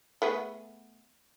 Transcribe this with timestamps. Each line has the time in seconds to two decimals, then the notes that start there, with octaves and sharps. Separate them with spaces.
0.22 A3 B3 G#4